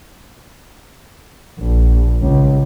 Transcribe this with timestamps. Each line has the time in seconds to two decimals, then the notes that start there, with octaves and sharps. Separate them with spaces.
1.60 A#1
2.23 C#2